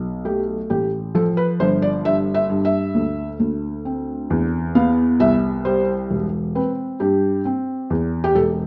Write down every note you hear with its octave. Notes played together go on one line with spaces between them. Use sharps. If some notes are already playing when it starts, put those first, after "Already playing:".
Already playing: B1
A3 G4
A1 G4
F3 A4
B4
G1 C5
D5
G2 E5
E5
G2
E5
D2
D2
C4
E2
B3 F5
C2 E5
G3 C5
E1
C4 B4
G2 G4
C4
E2
G4
E1 A4